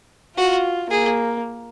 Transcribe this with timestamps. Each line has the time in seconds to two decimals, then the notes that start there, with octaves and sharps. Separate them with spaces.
0.37 F4 F#4
0.90 A#3 G#4